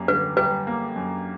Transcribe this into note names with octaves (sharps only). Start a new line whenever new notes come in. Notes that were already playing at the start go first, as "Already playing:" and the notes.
Already playing: F#2 G3 A#3
D3 B4
G3 B4
A#3
F#2